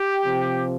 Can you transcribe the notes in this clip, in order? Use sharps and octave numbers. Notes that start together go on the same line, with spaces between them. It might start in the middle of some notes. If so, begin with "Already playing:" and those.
Already playing: G4
C3 F3